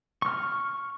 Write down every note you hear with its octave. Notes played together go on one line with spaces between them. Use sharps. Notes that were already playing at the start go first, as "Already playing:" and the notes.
C#6 F6